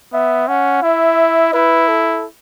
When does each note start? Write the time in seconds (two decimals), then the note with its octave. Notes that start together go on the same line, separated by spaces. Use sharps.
0.13 B3 E5
0.48 C#4 F#5
0.83 E4 E5
1.53 E4 B4
1.88 A4